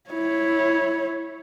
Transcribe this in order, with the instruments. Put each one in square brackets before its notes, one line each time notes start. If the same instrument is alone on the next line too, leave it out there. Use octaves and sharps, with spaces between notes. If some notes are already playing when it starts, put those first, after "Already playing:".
[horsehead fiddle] E4 C#5